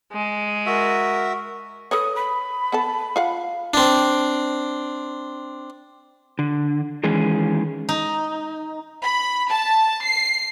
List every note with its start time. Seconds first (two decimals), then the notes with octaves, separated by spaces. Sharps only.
0.13 G#3
0.66 F#4 A#4 E5
1.91 A4 B4 C#5 D#6
2.15 B5
2.72 B3 A4 A5
3.16 F4 F5 F#5
3.74 C4 D4
6.39 D3
7.04 D#3 E3 G#3 C#4 G#4
7.89 D#4
9.03 B5
9.50 A5
10.04 C7